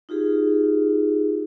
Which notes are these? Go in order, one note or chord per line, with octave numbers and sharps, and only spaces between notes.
D#4 F4 G4 G#4